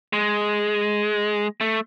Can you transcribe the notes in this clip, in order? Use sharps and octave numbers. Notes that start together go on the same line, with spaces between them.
G#3
A3